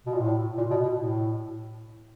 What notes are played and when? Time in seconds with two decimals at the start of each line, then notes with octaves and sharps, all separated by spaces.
0.06 B2
0.13 A#2
0.20 A2
0.57 A#2
0.70 B2
0.83 B2
0.95 A2